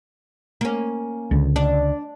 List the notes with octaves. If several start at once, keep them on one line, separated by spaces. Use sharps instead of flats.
A#3 C#4
C#2 D3
D4